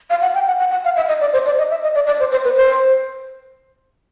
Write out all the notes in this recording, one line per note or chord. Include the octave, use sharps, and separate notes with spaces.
F5
F#5
G5
F#5
F#5
F#5
F5
E5
D#5
D5
C5
D5
D#5
E5
D#5
D5
D5
C5
C5
B4
C5